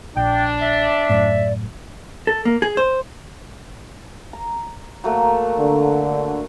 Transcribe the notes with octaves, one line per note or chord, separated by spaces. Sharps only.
A#1 D4 G5
E5
F#1 F#2 A2 D5
A4
A#3
G#4
C5
A#5
F#3 A3 A#3
D3